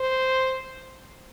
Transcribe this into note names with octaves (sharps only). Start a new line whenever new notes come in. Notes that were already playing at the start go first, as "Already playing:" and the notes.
Already playing: C5